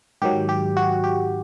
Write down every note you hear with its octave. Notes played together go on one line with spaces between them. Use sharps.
G#2 D#3 F#3 G4
G4
F#4
G4